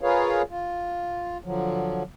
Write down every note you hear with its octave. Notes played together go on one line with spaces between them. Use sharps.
F4 G#4 A#4 B4 C#5 F5
F4
D3 F3 F#3